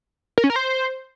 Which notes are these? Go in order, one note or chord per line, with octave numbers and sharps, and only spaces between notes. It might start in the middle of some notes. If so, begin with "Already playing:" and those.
A#4
C#4
A#4
C5